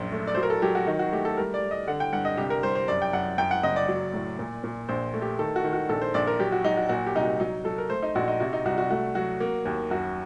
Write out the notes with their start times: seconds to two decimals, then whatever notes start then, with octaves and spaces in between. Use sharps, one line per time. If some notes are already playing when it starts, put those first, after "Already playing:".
Already playing: A#1 F#2 C5
0.12 A3
0.27 D5
0.35 F#3 C5
0.43 A#4
0.50 A4
0.62 F#3 G4
0.75 F#4
0.87 D#3 D#4
0.99 F#4
1.12 A3 G4
1.25 A4
1.37 G3 A#4
1.54 D5
1.62 G3
1.71 D#5
1.87 D3 F#5
2.00 G5
2.13 G2 F#5
2.25 D#5
2.37 C2 G4
2.50 A#4
2.63 G3 C5
2.75 C5
2.88 F#2 D5
3.02 G5
3.13 F#2 F#5
3.38 F#2 G5
3.51 F#5
3.63 F#1 D#5
3.76 D5
3.88 F#3
4.13 A2
4.39 A#2
4.64 A#2
4.89 A#1 C5
5.14 A3
5.22 G4
5.39 D#3 A4
5.56 F#4
5.64 D#3
5.73 F#4
5.89 A#1 A4
6.01 C5
6.14 A#1 D5
6.27 A#4
6.39 F#3 G4
6.52 F#4
6.64 F#3 D#4
6.77 F#4
6.89 A#2 F#4
7.06 G4
7.15 C2 D#4
7.23 F#4
7.40 F#3 D#4
7.65 F#3 A4
7.78 A#4
7.90 A3 C5
8.03 D#4
8.15 A#1 F#4
8.28 D#4
8.40 C3 F#4
8.53 D#4
8.65 C2 F#4
8.78 F#4
8.90 A3 F#4
9.15 F#3 F#4
9.40 A#3
9.65 D#2
9.91 F#2 F#4